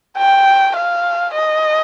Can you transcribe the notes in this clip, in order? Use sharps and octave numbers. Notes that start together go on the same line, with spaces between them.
G5
F5
D#5